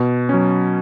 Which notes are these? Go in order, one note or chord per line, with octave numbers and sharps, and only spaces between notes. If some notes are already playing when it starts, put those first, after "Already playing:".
Already playing: B2
F#3 C#4